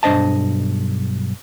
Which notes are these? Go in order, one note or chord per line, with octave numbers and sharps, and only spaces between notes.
B1 G2 D4 C5 D#5 A5